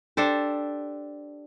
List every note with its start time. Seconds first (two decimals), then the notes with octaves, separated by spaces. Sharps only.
0.17 D4 G4 A4 C5